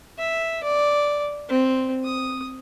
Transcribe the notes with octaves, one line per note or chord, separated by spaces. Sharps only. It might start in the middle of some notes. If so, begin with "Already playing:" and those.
E5
D5
C4
D#6